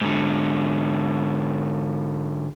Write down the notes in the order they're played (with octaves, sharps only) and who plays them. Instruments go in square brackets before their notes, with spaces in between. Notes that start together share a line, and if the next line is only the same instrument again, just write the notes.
[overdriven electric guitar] G#2 D3